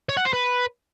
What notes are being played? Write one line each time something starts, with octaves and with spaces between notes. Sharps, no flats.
C#5
F#5
C5
B4